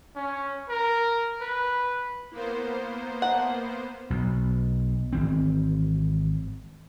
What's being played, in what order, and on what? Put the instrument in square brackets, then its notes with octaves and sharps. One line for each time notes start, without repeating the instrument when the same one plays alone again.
[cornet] C#4
A#4
B4
[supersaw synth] A#3 B3 C5 [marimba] E4 A#4
[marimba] E5 A5 A#5 [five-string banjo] F#5
[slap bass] B1 B2
G#1 E3 C4